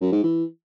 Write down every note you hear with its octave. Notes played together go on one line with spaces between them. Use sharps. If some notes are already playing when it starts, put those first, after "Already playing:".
F#2
G#2
E3